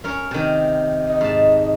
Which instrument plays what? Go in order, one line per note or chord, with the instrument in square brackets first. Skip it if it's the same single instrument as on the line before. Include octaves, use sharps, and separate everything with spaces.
[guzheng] C#4 A#4 C#5
C3 D#3
[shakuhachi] D#5
[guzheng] G#2 A5